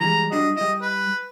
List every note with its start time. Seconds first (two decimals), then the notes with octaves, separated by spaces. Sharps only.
0.01 E3 G3 G#3 A#5
0.32 G3 D4 F#4 D#5
0.56 G3 E4 D#5
0.82 B4